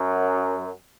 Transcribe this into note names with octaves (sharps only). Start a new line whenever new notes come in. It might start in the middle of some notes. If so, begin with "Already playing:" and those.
Already playing: F#2